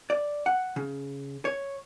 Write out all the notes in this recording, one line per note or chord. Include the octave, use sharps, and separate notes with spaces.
D5
F#5
C#3
C#5